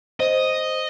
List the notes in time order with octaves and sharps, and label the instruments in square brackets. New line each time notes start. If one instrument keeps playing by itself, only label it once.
[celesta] C5 [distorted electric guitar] D#5